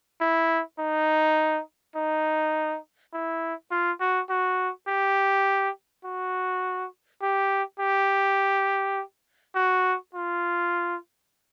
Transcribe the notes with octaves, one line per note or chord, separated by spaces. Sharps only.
E4
D#4
D#4
E4
F4
F#4
F#4
G4
F#4
G4
G4
F#4
F4